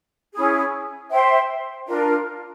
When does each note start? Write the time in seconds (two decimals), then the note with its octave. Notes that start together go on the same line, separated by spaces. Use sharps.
0.34 C#4 E4 G#4
1.11 C5 E5 G5 C6
1.87 D4 F4 A#4